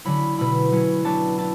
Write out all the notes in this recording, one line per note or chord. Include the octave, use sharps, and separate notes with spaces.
D3 F#3 C#4 E4 B5
B2 A3 E4 B5
F#3 C#4 E4
F#3 B3 D4 A5
E4 A5